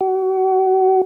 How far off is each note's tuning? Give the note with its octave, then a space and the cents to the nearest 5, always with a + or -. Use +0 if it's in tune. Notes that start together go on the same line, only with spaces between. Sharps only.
F#4 +35